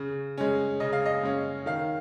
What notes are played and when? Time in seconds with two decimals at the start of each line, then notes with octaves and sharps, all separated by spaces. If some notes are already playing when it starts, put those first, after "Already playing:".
Already playing: C#3
0.38 G#3 C#4
0.80 C#3 D#5
0.93 F5
1.06 D#5
1.23 G#3 C#4
1.66 D#3 F5